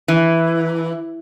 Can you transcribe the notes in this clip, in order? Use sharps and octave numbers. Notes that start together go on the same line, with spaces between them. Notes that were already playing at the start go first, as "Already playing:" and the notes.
E3